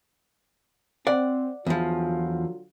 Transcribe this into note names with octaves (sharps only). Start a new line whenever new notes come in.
C4 D5 F#5
E2 D3 F3 F#3 F4